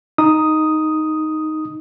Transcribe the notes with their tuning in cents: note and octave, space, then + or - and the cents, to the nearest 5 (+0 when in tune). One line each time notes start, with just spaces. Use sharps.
D#4 +0 D#6 +0